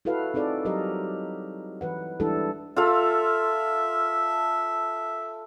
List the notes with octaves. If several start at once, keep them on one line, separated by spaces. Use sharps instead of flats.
E4 F#4 A4 B4 F5
C4 D#4 G#4 A4 D5
F#3 G3 G4 A#4 D#5
E3 B4 F#5
E3 G3 G#3 D4 E4 A4
F4 A4 E5 F5